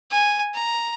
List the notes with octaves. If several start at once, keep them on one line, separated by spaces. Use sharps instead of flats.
G#5
A#5